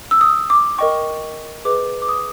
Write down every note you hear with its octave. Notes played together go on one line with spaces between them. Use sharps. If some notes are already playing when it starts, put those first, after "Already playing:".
E6
D#6
D6
A#4 D#5 G5 C#6
G#4 B4 D#5 D6
D6
D#6